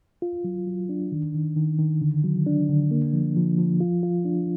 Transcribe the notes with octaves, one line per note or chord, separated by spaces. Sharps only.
F4
F#3
F#3
D4
D#3
D#3
D#3
D#3
D3
F#3
D4
D3
A#3
F3
F3
F3
F4
F4
D4